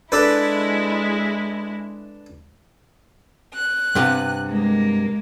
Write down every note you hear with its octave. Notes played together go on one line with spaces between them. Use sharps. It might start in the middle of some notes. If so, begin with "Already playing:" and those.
G#3 D4 E4 A4 B4
F#6
G2 C3 B3
G#3 A#3